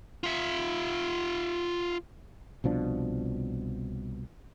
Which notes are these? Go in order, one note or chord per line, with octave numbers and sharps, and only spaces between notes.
F4 E5
C2 B2 F3 D4